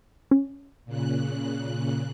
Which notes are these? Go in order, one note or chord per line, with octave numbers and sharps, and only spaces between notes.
C#4
A#2 C#3 F#6